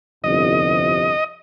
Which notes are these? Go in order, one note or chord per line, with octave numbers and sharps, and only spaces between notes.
G1 C2 F2 D#5